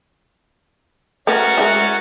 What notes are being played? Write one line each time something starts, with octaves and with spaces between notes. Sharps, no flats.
A3 C#4 F#4 A#4 B4 F#5 A6
G#3 D#4 E4